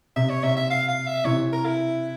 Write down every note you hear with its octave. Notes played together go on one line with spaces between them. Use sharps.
C3 E5
C#5
C3 E5
E5
F5
F5
E5
C3 E3 C#5
A#4
E4